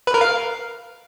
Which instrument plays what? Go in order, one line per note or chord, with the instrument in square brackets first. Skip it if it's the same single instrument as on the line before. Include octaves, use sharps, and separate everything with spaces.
[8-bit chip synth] B4
A#4
F5